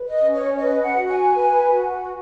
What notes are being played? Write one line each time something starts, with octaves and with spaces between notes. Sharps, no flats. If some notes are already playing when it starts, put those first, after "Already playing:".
Already playing: B4
D#5
C#4
C#5
B4 D#5
F#5
F#4
G#5
B4
F#4